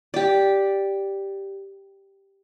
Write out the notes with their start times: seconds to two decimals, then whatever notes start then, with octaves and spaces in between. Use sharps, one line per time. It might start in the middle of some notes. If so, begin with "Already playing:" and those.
0.14 G4 D5